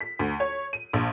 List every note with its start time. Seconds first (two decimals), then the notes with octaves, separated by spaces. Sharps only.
0.01 B6
0.19 D2
0.40 C#5
0.73 D#7
0.93 A#1